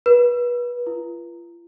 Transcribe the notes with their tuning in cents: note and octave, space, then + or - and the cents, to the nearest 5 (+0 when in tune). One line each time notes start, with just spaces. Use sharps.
B4 -30
F4 -35